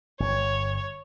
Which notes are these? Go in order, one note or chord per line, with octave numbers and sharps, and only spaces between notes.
G1 C#5